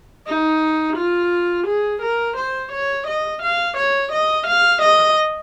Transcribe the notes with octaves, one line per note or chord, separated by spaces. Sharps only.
D#4
F4
G#4
A#4
C5
C#5
D#5
F5
C#5
D#5
F5
D#5